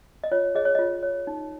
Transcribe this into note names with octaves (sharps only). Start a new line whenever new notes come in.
D#5
F4 C#5
G#4 C#5 D#5
C#5
F4 D#5
C#5
D#4